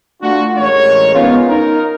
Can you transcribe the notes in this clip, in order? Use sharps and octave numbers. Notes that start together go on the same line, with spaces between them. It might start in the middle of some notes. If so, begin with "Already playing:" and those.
A3 D4 F4 F#4
A1 G#3 A#4 C#5
B3 C#4 D#4 F4
D#4 A#4